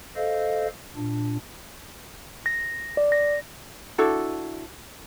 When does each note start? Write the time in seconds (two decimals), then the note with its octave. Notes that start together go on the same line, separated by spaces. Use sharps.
0.16 A4 C5 D#5 F5
0.96 A#2 D4
2.46 A#6
2.97 D5
3.12 A#6
3.98 D4 E4 F#4 A4